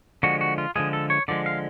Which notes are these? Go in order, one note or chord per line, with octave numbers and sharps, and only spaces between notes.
D3 F3 G#3 F#4
F#4
F4
D3 F3 G#3 G#4
A4
C#5
D3 F3 G#3 D5
F5